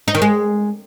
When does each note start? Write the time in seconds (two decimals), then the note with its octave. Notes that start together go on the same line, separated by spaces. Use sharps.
0.08 D#4
0.15 D#3
0.22 G#3